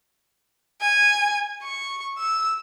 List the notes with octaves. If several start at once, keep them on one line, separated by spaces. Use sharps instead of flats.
G#5
C#6
E6